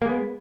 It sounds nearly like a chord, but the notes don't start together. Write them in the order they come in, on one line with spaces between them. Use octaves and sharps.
A#3 G#3 B3